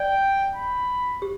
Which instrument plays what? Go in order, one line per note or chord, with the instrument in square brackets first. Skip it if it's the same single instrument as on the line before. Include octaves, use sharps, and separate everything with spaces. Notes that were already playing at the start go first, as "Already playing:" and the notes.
Already playing: [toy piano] D5 [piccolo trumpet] G5
[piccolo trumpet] B5
[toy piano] G4